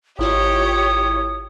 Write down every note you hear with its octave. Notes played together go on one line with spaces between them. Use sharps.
G#1 E4 F4 G4 C#5 D#6